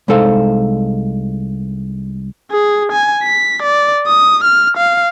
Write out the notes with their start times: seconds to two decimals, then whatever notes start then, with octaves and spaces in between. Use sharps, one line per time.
0.08 C2 G#3 D#4 A4 C5 F5
2.51 G#4
2.92 G#5
3.24 B6
3.63 D5
4.07 D#6
4.44 F6
4.78 F5